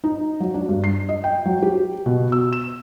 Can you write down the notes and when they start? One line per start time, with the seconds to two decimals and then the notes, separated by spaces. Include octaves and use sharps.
0.04 D#4
0.40 F#3
0.54 D4
0.69 G2
0.84 C7
1.09 D#5
1.24 G5
1.45 F#3
1.62 G4
2.06 B2
2.32 E6
2.53 E7